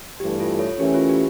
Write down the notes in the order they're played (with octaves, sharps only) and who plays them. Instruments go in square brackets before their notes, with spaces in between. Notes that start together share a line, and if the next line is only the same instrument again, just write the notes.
[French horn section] G2 E3 A3 [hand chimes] G4
[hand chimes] F4 A4
A4 C#5
[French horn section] E3 A3 C#4 [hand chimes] G4 A#4
[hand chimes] F4
G4